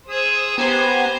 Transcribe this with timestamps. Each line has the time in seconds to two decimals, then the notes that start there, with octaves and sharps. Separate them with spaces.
0.10 G#4 C5 D#6 E6
0.58 B3 G4 C5 G#5 A#5